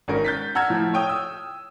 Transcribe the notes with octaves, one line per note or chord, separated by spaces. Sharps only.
G#1 C#4 A#4
G6 A6 B6
F#5 A#5 E6 F6 G#6
A2 F3
C#5 G5 D#6
E6